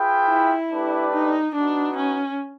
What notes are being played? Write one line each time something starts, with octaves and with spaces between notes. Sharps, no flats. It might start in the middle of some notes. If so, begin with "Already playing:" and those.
Already playing: F4 G#4 B4 E5 G5
E4
A3 D4 G4 B4 D5
D#4
B3 D4 D#4 F#4 B4
C#4